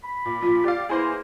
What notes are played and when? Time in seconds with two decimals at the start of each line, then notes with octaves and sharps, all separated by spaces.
0.03 B5
0.25 A#2
0.42 A#2 F3 F4
0.64 G4 D5 F5
0.89 E2 A#3 E4 G#4 C5 C6